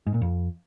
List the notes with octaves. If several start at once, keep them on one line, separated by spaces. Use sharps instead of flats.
G#2
A#2
F2